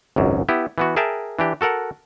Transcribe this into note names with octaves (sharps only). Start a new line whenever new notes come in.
G#1 C#2 F#2
B3 E4 G4
E3 B3 F#4
G#4 A#4 E5 G5 A5
E3 D4 G4
F#4 A4 A#4 F#5